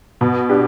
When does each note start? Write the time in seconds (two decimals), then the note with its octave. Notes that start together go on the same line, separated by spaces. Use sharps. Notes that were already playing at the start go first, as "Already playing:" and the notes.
0.21 B2
0.49 D4 G4